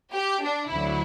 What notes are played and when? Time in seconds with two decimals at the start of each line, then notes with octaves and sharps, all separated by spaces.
0.15 G4
0.44 D4
0.71 D2 D3 F#3 E4